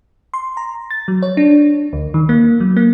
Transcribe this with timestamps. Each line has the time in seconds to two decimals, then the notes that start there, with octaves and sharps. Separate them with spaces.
0.34 C6
0.57 A#5
0.90 A6
1.08 F#3
1.23 C#5
1.37 D4
1.93 D2
2.14 D#3
2.29 A#3
2.60 F#3
2.77 A#3